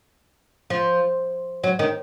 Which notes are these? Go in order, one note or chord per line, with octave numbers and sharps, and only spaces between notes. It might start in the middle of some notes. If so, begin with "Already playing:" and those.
F3
F#3
D#3